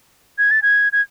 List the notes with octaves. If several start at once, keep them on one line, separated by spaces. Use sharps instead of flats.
G#6
A6
G#6
G#6